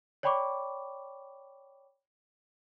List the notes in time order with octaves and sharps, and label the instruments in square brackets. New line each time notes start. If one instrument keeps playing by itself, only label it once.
[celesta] C#5 D5 G5 B5 C#6 D6